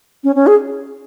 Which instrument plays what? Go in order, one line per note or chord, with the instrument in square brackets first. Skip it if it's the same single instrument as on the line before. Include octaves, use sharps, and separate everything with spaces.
[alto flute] C#4
C#4
G#4